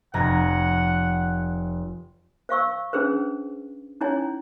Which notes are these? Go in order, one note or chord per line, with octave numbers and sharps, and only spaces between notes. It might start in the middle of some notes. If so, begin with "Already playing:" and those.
F1 F#5 A#5 G#6
C5 F5 C#6 E6
C#4 D4 G#4 B4 C5
C#4 D#4 E4 C#5 G#5